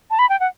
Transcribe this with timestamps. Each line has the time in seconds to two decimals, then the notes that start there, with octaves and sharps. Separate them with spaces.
0.11 A5
0.19 B5
0.29 G5
0.40 F#5